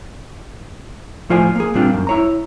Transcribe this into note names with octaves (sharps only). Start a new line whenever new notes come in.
A2 F3 F4 C5 D5 G#5
A#3 G#4
A#2 G3 C4 D4 F4 G4
F#2
E4 C#5 A#5